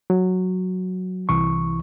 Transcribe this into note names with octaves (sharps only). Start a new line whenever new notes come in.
F#3
C2 E3 C#6